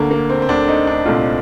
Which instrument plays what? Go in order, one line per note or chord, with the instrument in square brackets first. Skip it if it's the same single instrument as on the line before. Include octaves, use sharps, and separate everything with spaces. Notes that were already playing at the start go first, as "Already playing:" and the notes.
Already playing: [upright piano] D2 D3 A3 [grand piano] A#3
[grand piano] A#3
C4
C4
[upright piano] D2 D3 A3 [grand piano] D4
[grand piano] D#4
D4
[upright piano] C2 A#2 A3 C4 F4